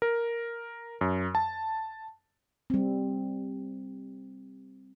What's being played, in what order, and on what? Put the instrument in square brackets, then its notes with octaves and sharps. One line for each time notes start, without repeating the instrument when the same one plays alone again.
[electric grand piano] A#4
F#2
A5
[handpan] G3 C4